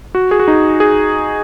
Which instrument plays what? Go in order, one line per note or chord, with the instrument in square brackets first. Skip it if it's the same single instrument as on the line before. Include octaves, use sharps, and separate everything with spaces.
[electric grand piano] F#4
G#4
F#4
D#4
G#4